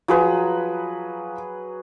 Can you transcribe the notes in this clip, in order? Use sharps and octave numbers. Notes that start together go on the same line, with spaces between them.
F3 F#3 G#4 B4